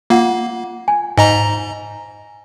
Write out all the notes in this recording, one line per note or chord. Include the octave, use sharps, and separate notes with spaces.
A#3 F4 F#5
G#5
G#2 D#5 G#5 A#5